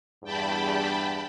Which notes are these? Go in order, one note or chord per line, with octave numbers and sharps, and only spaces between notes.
E2 G2 G5 A5 B5